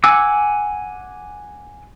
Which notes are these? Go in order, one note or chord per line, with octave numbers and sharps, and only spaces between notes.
F#5 G#5 D6 E6